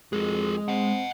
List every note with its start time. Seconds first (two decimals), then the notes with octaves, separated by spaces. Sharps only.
0.13 F2 G#3 G#4 A#4
0.68 C4 D#5 F#5